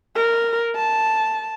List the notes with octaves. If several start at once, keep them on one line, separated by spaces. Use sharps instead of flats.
A#4
A5